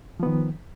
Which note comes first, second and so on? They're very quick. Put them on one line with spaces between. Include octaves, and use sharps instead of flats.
F3 B3 D#3